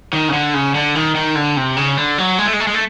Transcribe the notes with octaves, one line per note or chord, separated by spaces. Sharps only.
D#3
C#3
D3
C#3
D3
D#3
D#3
D3
C3
C#3
D3
F#3
G#3
A3
G#3
A3
G#3
A3